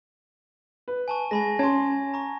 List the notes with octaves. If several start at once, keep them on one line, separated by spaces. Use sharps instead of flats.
B4
G#5 A5 C#6
G#3 G#5 B5 A#6
C#4 A5 C6 G#6
A#5 C#6